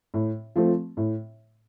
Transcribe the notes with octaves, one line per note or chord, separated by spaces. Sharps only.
A2
F3 A3 C4
A2